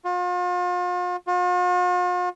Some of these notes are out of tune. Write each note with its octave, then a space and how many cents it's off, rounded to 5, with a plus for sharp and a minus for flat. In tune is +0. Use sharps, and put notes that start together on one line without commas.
F4 +40
F4 +45